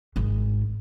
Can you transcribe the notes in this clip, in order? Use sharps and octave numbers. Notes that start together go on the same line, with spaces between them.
G#1 G#2